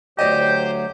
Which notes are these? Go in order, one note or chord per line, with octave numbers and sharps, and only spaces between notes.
D2 F#3 G4 C5 D5 D#5 G6